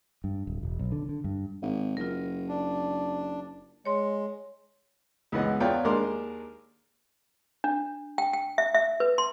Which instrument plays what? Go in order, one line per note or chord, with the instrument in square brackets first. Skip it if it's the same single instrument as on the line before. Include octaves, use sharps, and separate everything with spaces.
[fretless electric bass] G2
D1
E1
B1
D3
D3
G2
[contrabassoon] G#1
[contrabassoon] F#1 [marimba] F4 A#4
[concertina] D4
[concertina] G#3 [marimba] C#5 C6
[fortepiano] C#2 E3 B3 D#5 F#5
E2 B3 F4 C#5 D5 G5
D#2 G#3 D4 A#4 C6 D6
[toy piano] D4
G5
G5
E5
E5
B4
C6